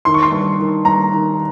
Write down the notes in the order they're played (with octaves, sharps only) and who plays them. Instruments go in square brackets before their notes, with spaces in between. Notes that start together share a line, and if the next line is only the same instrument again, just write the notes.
[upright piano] D#3 C6
C#6
C6
G2
D#3
G2 A#5
D#3